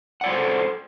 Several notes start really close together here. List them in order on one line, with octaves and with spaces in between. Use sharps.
F#5 D5 F4 C5 A4